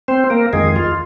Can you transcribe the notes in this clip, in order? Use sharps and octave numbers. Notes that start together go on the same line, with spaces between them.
C4 C5
A#3 A#4
F2 D#3 G#3 G#4
F4